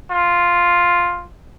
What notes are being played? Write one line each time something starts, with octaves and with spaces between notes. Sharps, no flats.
F4